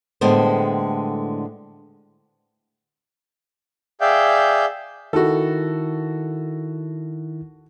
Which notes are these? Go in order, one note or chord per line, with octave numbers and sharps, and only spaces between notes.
A2 D3 G3 G#3 B3 C5
G#4 D5 E5 F5 G5 G6
D#3 E4 F#4 A4